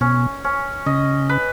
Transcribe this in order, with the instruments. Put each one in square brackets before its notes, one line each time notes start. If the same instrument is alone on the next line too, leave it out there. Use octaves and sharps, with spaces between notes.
[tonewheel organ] B2 [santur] C#4
[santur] C#4
[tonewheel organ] C#3 [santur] D#5
[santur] B4